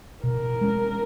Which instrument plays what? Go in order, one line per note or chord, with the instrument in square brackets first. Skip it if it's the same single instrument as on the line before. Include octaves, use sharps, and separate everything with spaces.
[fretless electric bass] B2 [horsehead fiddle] A#4
[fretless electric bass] G#3 C#4